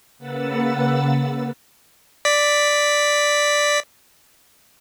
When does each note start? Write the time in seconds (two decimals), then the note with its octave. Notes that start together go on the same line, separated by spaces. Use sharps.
0.18 C#3 A#3 B4 F#5 E6 A6
2.25 D5 B6